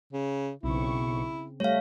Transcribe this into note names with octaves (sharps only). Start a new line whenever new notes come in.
C#3
B1 C#3 C4 E4 C#6
G3 A3 C#5 F5 A#6